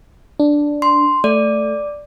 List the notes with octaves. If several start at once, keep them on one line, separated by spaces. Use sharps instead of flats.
D4
C6
A3 D5